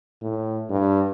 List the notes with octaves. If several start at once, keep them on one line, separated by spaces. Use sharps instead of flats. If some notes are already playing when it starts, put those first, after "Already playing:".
A2
G2